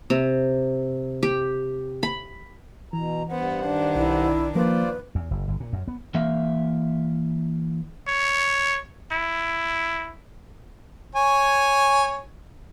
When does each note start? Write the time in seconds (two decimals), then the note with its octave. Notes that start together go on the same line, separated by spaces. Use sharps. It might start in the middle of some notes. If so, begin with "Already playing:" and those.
0.10 C3
1.23 G4
2.03 B5
2.93 B2 E3 A#5
3.30 G2 B3 C5 F#5
3.62 D#3 D4
3.96 B1 E4
4.55 F3 A#3 F4 B4 C5 D5
5.15 E2
5.31 F#1
5.48 G1
5.60 A#2
5.73 F#2
5.88 B3
6.14 E3 A#3 E5 F5
8.07 C#5
9.12 E4
11.15 C#5 G#5